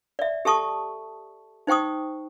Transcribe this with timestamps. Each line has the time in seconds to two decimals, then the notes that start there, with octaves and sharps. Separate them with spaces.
0.19 D5 E5
0.45 G4 A4 A5 C#6 D#6
1.67 D#4 C5 G5 C#6 D#6